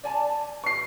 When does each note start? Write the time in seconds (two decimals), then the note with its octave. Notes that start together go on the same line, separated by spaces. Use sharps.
0.04 D5 G#5 A5
0.64 C#6 C7